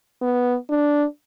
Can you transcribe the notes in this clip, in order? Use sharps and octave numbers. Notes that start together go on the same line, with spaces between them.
B3
D4